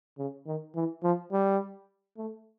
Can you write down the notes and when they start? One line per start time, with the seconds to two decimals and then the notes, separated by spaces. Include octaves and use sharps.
0.18 C#3
0.47 D#3
0.75 E3
1.03 F3
1.32 G3
2.17 A3